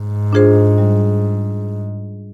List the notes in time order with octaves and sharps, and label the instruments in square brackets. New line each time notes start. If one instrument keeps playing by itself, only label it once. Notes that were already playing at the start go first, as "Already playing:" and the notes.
Already playing: [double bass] G#2
[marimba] D4 F4 G#4 C5
G3